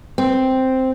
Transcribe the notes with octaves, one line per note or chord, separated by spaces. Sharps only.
C4